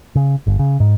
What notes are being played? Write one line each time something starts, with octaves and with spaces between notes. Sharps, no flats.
C#3
G1
C#3
G#2